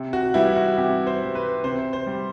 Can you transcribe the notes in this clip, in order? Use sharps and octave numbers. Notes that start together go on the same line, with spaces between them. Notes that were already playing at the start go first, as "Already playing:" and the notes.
Already playing: C3
F#4
E3 G3 E4
F#4
C3 G4
C5
E3 G3
B4
C3 C5
C5
G3